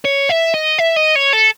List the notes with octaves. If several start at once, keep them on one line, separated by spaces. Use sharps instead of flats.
C#5
E5
D#5
E5
D#5
C#5
A4